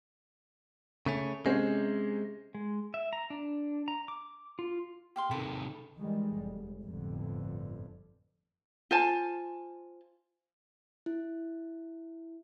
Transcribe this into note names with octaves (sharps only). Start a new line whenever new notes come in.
C#3 A3 C#4
C3 G#3 C#4 C5
G#3
E5
A#5
D4
A#5
D6
F4
G4 F5 C6
C3 D#3 A4 B5
D#3 E3 G3 G#3
F1
G1 F2 A2 D3
F4 C5 G#5 A5
E4